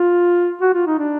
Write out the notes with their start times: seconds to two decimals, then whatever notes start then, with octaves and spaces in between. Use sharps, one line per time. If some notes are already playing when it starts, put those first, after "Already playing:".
Already playing: F4
0.61 F#4
0.74 F4
0.86 D#4
0.98 D4